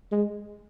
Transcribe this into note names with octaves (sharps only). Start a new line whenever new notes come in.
G#3